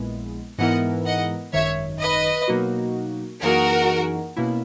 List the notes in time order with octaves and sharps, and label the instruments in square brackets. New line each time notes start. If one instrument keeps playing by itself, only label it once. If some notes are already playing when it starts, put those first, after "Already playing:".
Already playing: [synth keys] A#1 A#2 G#3 B3 E4
[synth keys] G#2 E3 B3 E4 A#4 [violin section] D#5 F#5
[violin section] D#5 F#5
[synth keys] G#1 F#2 D#3 [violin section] C#5 E5
[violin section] B4 D#5
[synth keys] B2 F#3 A#3 D#4 F#4
[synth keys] F#2 E3 A#3 D#4 G#4 [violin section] F#4 A#4
[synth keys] B2 A#3 C#4 E4